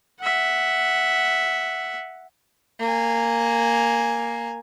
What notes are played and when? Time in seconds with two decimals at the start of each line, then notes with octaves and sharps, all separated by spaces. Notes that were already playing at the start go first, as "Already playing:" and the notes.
0.20 E5 F#5
2.80 A#3 G#5